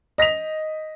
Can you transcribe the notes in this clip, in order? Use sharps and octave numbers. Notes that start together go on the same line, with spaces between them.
D#5 A#6 B6 F7